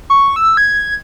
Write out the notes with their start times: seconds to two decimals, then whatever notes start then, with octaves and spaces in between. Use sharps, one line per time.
0.10 C#6
0.36 E6
0.57 G#6